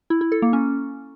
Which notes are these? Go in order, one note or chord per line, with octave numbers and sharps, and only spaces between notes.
E4
E4
A4
A#3
C#4